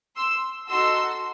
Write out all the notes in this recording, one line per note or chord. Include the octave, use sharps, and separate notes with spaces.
C6 E6
D#4 F#4 A4 C6 E6